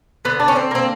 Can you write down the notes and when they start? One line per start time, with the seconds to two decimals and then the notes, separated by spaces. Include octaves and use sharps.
0.25 D3 B3
0.40 D4
0.48 C#4
0.56 C4
0.71 A#3 C4